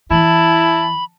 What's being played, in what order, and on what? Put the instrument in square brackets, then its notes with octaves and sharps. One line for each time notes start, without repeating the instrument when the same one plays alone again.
[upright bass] E2 E3 [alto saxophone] E4 [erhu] A5 [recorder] B5